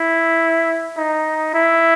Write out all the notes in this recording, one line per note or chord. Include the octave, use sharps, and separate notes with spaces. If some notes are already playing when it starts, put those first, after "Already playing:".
Already playing: E4
D#4
E4